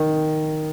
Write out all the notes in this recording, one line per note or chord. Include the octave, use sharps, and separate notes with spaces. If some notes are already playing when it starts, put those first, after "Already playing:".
Already playing: D#3